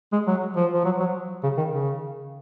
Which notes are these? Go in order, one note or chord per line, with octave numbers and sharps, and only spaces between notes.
G#3
F#3
F3
F3
F#3
F#3
C#3
D#3
C#3